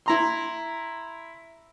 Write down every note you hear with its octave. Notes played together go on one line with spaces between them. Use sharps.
E4 A#5 C6